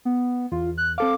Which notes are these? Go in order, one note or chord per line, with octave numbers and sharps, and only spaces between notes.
B3
E2 F4
F#6
C4 A4 F5 D6